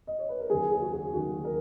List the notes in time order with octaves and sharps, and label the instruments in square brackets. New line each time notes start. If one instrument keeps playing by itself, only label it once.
[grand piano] D#5
C#5
B4
A#4
D#2 D#3 F#3 G#4
G#4
F#4
G#4
D#2 D#3 F#3 F#4
A#4